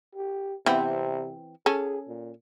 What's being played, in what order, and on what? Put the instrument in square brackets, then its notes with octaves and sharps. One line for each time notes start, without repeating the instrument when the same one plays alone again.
[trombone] G4
[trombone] C3 [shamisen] E3 B3 C4
[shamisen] C#4 A4 [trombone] G#4
[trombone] A#2